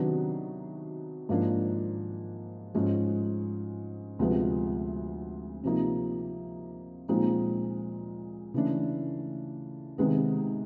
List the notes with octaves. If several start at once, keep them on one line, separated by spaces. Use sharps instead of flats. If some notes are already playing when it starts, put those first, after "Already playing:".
Already playing: C3 D#3 F#3 B3 D4
G#2 F3 A#3 D4
G#2 F3 G#3 C#4
D2 C3 F3 G#3 B3
C3 F3 A#3 D#4
A#2 F3 G#3 C4 D#4
C#3 E3 A3 D4
C3 D#3 G#3 B3